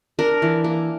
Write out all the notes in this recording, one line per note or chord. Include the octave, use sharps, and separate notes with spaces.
D4 A#4
E3
A#3